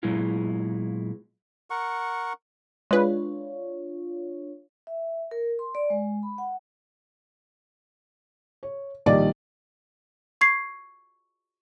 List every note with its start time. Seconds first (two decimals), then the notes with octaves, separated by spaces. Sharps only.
0.03 A#2 F#3 G#3 B3 E4 F4
1.70 A#4 F#5 C#6
2.91 G#3 D4 F4 B4 C#5
4.87 E5
5.31 A#4
5.59 C6
5.75 D5
5.90 G#3
6.23 B5
6.38 F#5
8.63 C#5
9.06 A#1 D#3 G3 D5 D#5
10.41 C#6 G#6 C7